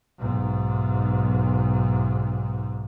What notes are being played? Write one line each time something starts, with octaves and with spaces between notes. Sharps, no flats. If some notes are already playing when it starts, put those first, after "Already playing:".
B1 G#2